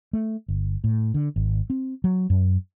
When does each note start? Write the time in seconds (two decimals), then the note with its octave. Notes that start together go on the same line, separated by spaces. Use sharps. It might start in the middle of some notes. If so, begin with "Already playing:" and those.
0.13 A3
0.48 G1
0.84 A2
1.14 D3
1.36 G#1
1.70 C4
2.04 F#3
2.30 F#2